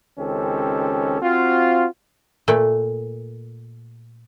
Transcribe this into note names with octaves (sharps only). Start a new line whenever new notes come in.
C#2 D#3 C4 C#4 G4 A4
C4 F4 F#4
A#2 A3